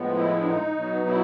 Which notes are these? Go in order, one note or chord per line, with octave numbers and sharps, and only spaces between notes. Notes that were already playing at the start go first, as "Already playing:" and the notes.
Already playing: A2 F3 G#3 B3
E4
D4
D#4
B2 F#3 B3
E4